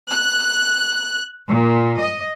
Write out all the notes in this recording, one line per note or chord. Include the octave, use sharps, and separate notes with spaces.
F#6
A#2
D#5